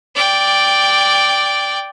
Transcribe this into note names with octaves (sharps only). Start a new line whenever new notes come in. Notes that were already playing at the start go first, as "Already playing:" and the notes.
D5 G5